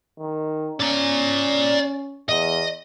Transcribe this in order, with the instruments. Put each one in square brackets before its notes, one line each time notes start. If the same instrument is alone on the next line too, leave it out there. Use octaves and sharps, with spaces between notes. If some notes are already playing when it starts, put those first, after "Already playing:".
[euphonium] D#3
[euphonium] C#4 [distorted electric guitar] D5 A#5
[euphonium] E2 [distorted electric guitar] D#5